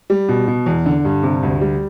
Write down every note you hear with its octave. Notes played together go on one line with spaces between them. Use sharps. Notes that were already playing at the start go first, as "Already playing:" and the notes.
G3
B2
B2
E2
D3
G2
C3
D2
G3